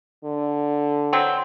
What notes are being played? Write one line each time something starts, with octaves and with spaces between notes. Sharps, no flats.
D3
E3 F#3 C4